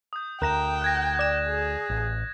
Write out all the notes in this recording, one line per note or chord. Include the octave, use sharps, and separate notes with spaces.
D#6 G6
D2 A#4 G5 A#5 F#6 E7
F#6 G#6 A#6
D5 E7
G#4
A1